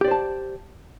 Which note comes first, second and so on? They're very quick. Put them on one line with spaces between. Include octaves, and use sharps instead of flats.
G4 D5 C5 A5